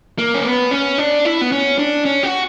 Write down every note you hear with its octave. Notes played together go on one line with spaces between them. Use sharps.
A#3
C#4
B3
C#4
D4
E4
B3
C#4
D4
C#4
F#4